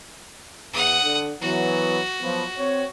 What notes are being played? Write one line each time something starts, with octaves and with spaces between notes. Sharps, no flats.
E2 F#5 D#6
D3
E3 F#3 B3 F#4
F3 F#3 B3
C4 C#5